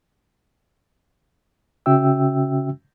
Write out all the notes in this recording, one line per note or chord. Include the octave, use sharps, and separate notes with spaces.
C#3 C#4 F#4 E5 G5 E6